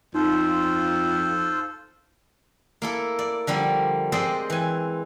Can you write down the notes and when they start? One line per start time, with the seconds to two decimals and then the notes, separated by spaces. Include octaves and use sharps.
0.15 F2 D#4 F4 A4 C5
2.82 A#3 E4 A4
3.19 D5
3.47 D3 F3 G3 A#3
4.12 G#3 C4 G4 C5 D5 D#5
4.50 E3 G#5